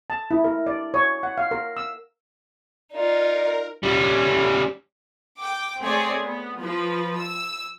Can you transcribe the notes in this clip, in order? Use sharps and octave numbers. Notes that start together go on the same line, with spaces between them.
A5
E4
A#4
D5
C#5
F#5
F5
A#4
E6
D#4 F4 A#4 D5
G3 C#4
G5 D6
A3 C4 G#4 C#5 D5
B3
F3 B4
E6